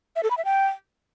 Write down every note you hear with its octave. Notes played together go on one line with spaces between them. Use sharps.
E5
A4
B5
E5
G5